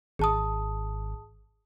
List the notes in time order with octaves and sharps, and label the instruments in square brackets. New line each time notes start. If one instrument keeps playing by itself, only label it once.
[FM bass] G#1 [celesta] G#4 A5 D#6